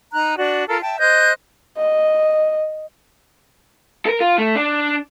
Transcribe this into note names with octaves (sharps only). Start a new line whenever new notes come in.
D#4 A#5 F#6
D4 F#4 D5
F4 A4 A#4
E5 G5 A5
C5 D#5 F#6 G6
D#5
A4 A#4
F4
A3
D4